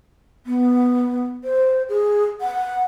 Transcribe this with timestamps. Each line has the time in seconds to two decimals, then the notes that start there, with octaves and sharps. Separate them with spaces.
0.46 B3
1.44 C5
1.89 G#4
2.41 F#5